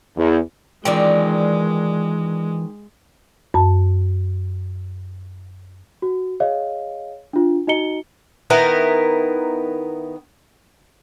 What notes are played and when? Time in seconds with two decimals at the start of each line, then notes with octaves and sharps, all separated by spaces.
0.17 E2
0.85 D#3 E3 G#3 F4 A#4 D5 G5
3.54 F#2 A5
6.02 F#4
6.40 G#4 C#5 D#5 F5
7.33 D4 F4
7.67 D#4 F#4 D#5 A#5 C#7 G7
8.50 D#3 B3 E4 A#4